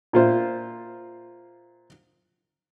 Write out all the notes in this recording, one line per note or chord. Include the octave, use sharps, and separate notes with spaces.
A#2 F4 C5 E5